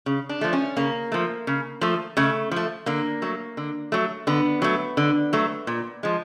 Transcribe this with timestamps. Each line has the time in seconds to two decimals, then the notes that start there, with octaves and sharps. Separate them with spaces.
0.06 C#3
0.29 D4
0.41 F3 A3
0.53 C#4
0.77 C#3 A#3
1.12 F3 A3
1.47 C#3
1.81 F3 A3
2.17 C#3 A3
2.51 F3 A3
2.86 D3 A#3
3.22 F#3 A3
3.57 D3
3.92 F#3 A3
4.27 D3 B3
4.62 F#3 A3
4.97 D3
5.33 F#3 A3
5.67 A#2
6.03 F3 G#3